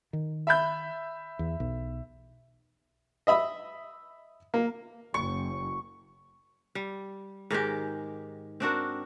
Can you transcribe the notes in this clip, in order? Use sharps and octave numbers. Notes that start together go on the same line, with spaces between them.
D#3
E5 B5 G6
E2
B1
D#5 E5 B5 D#6
A#3
F#1 C#6
G3
G#2 D#3 G#3 G4
C4 D4 F#4 A#4